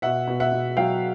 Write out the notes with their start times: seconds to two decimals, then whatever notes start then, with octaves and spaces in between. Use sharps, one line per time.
0.02 B2 E5 F#5
0.27 B2
0.40 E5 F#5
0.52 B2
0.77 F#3 F5 G5